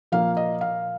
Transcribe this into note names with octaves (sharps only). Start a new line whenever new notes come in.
A#2 F3 A#3 F5
D#5
F5